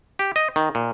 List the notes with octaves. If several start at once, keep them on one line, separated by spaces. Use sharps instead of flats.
G4
D#5
D#3
A#2